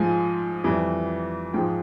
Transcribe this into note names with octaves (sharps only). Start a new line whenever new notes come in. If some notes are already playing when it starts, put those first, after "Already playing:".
Already playing: G#2 F3 G#3 G#5
F2 E3 G3
G#2 F3 G#3 G5